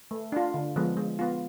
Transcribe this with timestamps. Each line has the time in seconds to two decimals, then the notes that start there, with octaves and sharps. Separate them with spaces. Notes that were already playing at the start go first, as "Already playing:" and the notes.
0.11 A3
0.32 D4 F4
0.54 D3
0.76 F3 G#3 B3
0.97 G#3
1.19 B3 F4